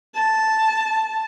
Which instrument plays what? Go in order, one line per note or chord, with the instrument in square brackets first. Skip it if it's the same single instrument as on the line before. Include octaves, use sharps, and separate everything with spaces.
[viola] A5